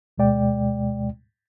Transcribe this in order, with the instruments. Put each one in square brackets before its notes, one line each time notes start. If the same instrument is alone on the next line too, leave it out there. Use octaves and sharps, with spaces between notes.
[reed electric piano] D2 B2 G#3 D5 G5